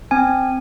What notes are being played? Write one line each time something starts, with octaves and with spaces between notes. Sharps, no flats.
C4 G#5